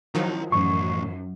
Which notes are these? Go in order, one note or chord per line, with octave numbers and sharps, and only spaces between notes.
D#3 F3 F#3 E4 A#5
F#2 A2 E3 C#6